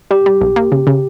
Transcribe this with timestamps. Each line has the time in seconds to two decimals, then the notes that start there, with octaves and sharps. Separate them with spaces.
0.11 G3 G4
0.26 G3
0.41 B1
0.56 A#3
0.72 C#3
0.87 C#3